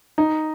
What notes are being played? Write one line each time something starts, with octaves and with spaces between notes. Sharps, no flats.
D#4